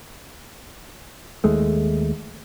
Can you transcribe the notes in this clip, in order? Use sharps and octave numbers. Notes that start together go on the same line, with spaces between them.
D#2 G#3 A3